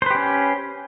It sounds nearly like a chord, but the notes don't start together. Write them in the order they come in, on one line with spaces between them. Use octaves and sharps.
C5 B4 G4 C#4